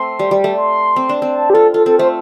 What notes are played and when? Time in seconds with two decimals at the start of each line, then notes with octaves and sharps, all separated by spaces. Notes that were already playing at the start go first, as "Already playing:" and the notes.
Already playing: A3 C4 C6
0.19 G3
0.31 G3
0.44 A3
0.57 C6
0.96 C4
1.09 D4
1.22 C4
1.34 A5
1.50 G4
1.54 F4 A4
1.74 F4 A4
1.86 C4 A4
1.99 A3 C5